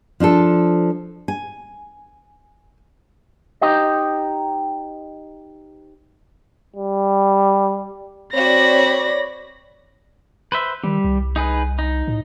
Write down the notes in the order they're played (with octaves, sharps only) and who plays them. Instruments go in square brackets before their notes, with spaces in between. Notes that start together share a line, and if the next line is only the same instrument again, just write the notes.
[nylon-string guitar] F3 D4 F4 A4
G#5
[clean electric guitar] D#4 G4 C5 D#5
[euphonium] G3
[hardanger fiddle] C4 F#4 [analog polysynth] C#5 D5 [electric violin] B5 A#6
[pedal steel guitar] B4 C5 E5
[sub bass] D#3 [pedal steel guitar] G3
[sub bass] C2
[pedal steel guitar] D#4 G#4 B4
D#4
[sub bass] A2